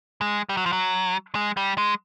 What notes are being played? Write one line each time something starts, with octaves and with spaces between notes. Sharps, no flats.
G#3
G3
F#3
F3
F#3
G#3
G3
G#3